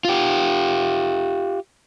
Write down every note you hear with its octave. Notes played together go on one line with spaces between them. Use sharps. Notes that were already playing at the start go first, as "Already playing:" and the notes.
F4 G4